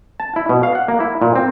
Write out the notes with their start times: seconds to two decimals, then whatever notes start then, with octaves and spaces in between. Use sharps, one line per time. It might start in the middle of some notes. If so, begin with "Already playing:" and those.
0.20 A5
0.36 E4
0.49 B2
0.63 F5
0.75 F#5
0.88 A#3
1.00 E4
1.22 A#2
1.36 C4